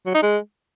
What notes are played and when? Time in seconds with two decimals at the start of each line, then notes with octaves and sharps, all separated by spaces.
0.06 F#3
0.14 D#4
0.22 G#3